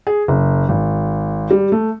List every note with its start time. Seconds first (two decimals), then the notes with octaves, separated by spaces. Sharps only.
0.07 G#4
0.28 F#1
0.69 G#1
1.51 G3
1.72 A3